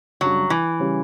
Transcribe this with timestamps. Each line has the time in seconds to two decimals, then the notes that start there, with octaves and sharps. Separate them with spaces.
0.21 F#2 C#3 F#3 G3 D4
0.50 E3
0.79 C#3 G3 C#4 G4